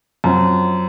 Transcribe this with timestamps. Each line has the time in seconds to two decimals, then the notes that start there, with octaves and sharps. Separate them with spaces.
0.24 F#2 F3 C4